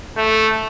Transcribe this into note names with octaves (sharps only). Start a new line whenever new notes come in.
A3